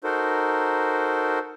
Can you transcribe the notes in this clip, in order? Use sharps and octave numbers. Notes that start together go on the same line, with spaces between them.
D#4 F#4 A4 A#4 C5